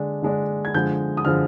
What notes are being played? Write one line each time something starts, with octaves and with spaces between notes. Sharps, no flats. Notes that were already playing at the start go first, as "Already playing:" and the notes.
Already playing: D3 G#3 D4
D3 G#3 D4
G#6
D3 F3 G#3 G6
D#6
D3 F3 G#3 F6